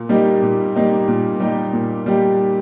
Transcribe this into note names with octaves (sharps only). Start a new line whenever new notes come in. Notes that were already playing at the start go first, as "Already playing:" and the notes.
Already playing: A#2
G3 A#3 D#4 G4
A#2
G3 A#3 D#4 G4
A#2
G3 A#3 D#4 G4
A#2
G3 A#3 D#4 G4